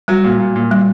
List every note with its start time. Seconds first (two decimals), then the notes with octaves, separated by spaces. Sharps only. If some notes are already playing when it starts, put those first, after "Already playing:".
0.08 F#3 G3
0.24 A#2
0.40 A#2
0.56 A#2
0.71 G3